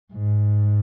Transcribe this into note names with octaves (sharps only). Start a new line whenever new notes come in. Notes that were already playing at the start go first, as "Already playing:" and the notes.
G#2